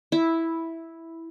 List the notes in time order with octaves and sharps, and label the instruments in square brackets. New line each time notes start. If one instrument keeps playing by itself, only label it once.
[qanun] E4